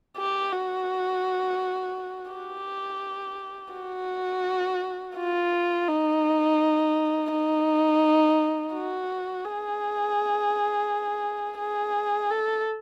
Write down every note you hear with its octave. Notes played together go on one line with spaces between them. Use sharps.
G4
F#4
G4
F#4
F4
D#4
D#4
F#4
G#4
G#4
A4